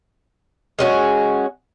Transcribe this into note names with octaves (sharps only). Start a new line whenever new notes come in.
G#3 C#4 F#4